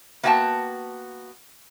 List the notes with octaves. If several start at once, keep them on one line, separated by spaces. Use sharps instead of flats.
A#3 B3 F#4 F5 G5 A5